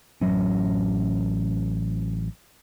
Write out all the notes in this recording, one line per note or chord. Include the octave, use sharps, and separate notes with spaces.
A1 F3 F#3 C#4